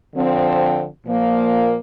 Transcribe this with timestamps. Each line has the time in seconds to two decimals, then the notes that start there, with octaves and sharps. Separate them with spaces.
0.16 D3 F3 C4
1.06 A#2 F3 A#3